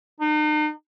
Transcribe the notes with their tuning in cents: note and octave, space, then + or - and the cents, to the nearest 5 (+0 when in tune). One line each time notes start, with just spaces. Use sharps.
D#4 -40